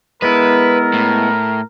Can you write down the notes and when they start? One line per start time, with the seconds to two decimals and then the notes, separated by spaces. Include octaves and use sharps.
0.22 G#3 B3 E4 A#4 B4
0.93 A2